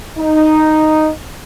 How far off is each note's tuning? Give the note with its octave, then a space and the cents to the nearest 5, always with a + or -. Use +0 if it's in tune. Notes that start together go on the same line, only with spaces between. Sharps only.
D#4 -5